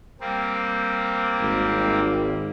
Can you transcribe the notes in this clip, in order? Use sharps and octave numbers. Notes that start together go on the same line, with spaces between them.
G3 A#3 C4
G#1